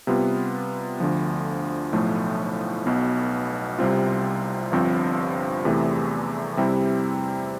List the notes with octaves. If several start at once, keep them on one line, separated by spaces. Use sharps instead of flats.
C3 G3 B3 F4
D2 D3 F3
B1 A2 F3 A3
B1 B2 B3
C2 C3 G3 C4 F4
G1 G2 F3 C4
E2 C3 E3 A3
C3 G3 C4 E4